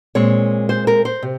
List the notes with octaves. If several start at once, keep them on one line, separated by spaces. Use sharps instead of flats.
A#2 G#3 C4 C#5
C5
A#4
C5
C3